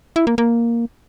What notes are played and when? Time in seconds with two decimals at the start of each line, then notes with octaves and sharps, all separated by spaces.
0.16 E4
0.27 A#3
0.38 A#3